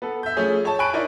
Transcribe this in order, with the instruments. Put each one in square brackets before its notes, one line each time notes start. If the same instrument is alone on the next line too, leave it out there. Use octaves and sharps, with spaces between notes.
[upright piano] B3 A4
E5 G6
F3 A3 C#4 G#4
C#5 A5
G#5 B5 C#6 F#6 D7
D#4 E4 A#4 C#5 D5